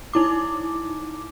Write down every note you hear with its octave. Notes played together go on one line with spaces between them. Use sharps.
D#4 E4 D6